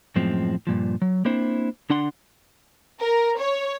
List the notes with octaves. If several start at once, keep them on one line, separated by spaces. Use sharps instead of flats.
F#2 A2 F3 G#3 C4
G2 A#2 F3
F#3
A#3 C4 D4 E4 C5
D3 D4 F#5 C6
A#4
C#5